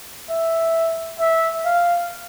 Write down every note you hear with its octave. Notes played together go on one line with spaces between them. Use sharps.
E5
E5
F5